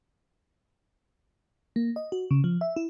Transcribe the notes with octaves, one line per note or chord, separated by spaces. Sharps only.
A#3
D#5
F#4
C#3
F3
E5
E4